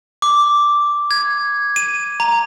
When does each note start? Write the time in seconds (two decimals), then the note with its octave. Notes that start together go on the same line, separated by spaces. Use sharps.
0.22 D6
1.11 G#6
1.76 D#7
2.20 A#5